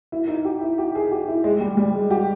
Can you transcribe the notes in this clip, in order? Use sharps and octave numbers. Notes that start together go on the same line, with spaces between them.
E4
D#4
G4
E4
G4
G#4
G4
E4
G#3
G3
G3
G#3
G4